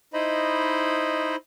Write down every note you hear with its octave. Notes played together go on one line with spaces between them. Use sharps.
D#4 E4 C5 D#5 B5